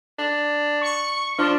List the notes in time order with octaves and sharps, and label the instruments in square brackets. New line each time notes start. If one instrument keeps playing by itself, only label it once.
[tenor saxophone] D4
[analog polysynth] C#6
[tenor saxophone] F3 [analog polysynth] D4